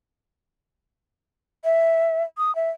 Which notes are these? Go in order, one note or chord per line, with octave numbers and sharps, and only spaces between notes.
E5
D#6
E5